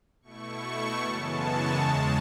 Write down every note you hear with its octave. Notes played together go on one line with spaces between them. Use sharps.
B2 A3 E4 C#6
F#2 C#3 E3 G#3 B3 A5
C#6
E2 C#3 G#3 A5